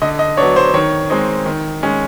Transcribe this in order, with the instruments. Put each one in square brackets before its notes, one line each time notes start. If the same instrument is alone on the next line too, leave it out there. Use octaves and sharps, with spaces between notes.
[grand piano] D3 D#5
D#5
F#3 B3 D4 C#5
C5
D#3 C#5
G#3 C4 D#4
D#3
G#3 C#4